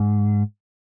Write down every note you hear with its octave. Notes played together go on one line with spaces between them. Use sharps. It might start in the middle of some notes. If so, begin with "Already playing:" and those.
Already playing: G#2